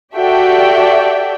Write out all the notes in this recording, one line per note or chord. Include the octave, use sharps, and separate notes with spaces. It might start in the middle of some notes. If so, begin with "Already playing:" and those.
F#4 G4 A4 D5 E5 G5